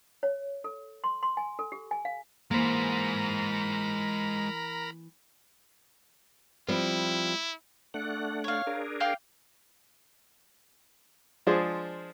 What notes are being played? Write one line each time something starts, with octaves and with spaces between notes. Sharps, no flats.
C#5
A4
C6
C6
G#5
A4
G4
G#5
F5
E3 G#3 A#3 A#4 C5 A#5 B5
F3 G3 C4 E4
A3 D4 F#5
C#5 F5
D4 G#4 A#4
F5 G5 D6
F3 G#3 D4 G#4 C5